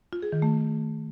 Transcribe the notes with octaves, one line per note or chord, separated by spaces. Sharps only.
F4
G#4
D#3
A3